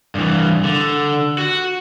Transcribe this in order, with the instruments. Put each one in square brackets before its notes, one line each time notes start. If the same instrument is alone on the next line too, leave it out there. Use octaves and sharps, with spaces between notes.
[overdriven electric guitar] G2 E3
D3
F#4